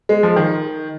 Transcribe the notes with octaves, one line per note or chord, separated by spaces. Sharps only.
G#3
F3
D#3